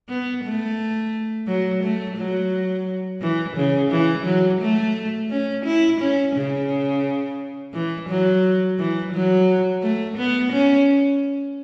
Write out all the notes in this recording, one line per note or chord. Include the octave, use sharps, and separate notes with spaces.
B3
A3
F#3
A3
F#3
E3
C#3
E3
F#3
A3
C#4
E4
C#4
C#3
E3
F#3
E3
F#3
A3
B3
C#4